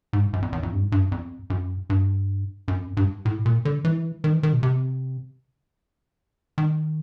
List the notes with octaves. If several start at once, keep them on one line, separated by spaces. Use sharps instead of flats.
G#2
F#2
F2
E2
F2
G2
G#2
G2
F#2
F2
F#2
G2
F#2
F2
F#2
G2
A2
A#2
D3
E3
D#3
E3
D#3
B2
C3
D#3